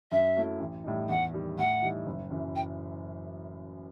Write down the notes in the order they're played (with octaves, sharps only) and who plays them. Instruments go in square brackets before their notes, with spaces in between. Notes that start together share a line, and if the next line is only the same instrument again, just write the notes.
[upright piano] F#2 [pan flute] E5
[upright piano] F#3 A3 E4
A1
A2 G3 D#4
[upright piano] E2 [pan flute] F#5
[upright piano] D#3 G3
[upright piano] A2 [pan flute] F#5
[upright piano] E3 G3 D#4
F#1
F#2 E3
[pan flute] G5